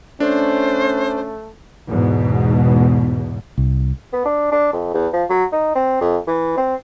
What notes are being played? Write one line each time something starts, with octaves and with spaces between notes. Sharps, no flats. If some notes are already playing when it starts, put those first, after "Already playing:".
A3 C#4 D4 C5
E2 G#2 B2
C2
B3
D4
D4
F2
E2
F3
F#3
D#4
C4
F2
E3
C4